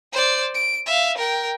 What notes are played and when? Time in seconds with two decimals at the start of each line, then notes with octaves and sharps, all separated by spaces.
0.12 C5 D5
0.54 D7
0.86 E5 F5
1.17 A#4 G5